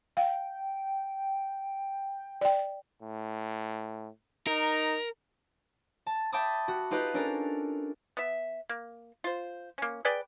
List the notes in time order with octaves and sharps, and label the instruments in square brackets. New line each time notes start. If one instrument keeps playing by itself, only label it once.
[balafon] F5 [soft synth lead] G5
[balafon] D5 G5
[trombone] A2
[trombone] D#4 [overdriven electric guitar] A#4
[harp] A5
E5 G5 A5 B5 D6 D#6
F#4
D#4 F4 G4 B4 D#5
C#4 D4 G4 A4 A#4
[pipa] B3 E5
A#3
F4 C5
A#3 C#4
G#4 B4 D5 G5